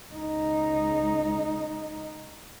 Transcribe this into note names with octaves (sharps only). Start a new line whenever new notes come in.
C#2 D#4